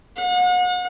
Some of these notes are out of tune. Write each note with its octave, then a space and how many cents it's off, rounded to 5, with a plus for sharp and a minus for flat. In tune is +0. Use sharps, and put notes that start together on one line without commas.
F#5 -40